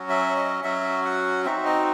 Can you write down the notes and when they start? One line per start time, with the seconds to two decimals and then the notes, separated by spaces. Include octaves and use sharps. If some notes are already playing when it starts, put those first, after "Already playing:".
Already playing: F#3 C#4 F#4
0.09 E5
0.36 D#5
0.64 F#3 C#4 F#4 E5
1.05 F#5
1.45 C4 D#4 F#4 E5
1.65 D#5